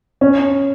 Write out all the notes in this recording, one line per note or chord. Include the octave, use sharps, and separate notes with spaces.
C#4